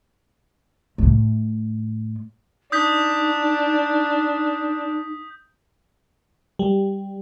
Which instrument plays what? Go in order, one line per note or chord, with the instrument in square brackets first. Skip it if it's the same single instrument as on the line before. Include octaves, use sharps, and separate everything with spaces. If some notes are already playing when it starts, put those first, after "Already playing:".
[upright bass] A2 A3
[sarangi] D4 [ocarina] D#4 [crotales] D#6 G6 B6
[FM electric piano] G3